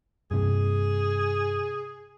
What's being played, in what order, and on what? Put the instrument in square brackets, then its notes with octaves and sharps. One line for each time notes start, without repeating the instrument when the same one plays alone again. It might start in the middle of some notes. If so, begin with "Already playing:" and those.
[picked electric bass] G2 C3 [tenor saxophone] G#4